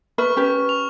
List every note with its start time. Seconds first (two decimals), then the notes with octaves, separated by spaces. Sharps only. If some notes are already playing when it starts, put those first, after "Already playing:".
0.18 B4 E5 B5 C#6 F6
0.36 C#4 G4 B4
0.69 F7